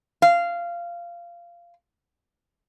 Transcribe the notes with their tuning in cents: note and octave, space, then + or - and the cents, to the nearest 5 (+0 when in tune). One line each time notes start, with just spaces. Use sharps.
F5 -15